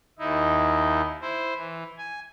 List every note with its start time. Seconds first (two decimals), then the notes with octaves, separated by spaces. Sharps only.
0.19 D#2 D#4 E4
1.21 E4 C5
1.57 E3
1.98 G#5